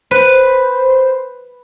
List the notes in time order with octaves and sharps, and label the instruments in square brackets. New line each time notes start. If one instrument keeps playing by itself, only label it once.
[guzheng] B4 [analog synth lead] C5